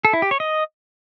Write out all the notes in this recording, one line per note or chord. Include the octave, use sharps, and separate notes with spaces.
A4
E4
G4
C#5
D#5